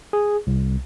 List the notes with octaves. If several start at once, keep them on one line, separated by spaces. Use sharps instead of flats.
G#4
C2